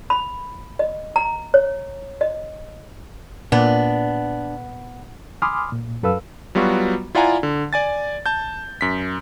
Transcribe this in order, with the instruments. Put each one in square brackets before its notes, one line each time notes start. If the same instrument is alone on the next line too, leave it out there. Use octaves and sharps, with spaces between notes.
[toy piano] B5
D#5
A#5
C#5
D#5
[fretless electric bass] A#2 [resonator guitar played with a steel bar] B3 [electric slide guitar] D4
[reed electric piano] G#5 B5 C6 D6 D#6 F6
A#2
F#2 A4 B4 F5 E6
[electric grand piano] F#3 G3 B3 F4 F#4
E4 F4 D5 F#5 G#5 A#5
D3
D5 G#5 A6
A5 G6
F#2 B6